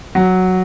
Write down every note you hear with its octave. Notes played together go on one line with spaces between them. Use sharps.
F#3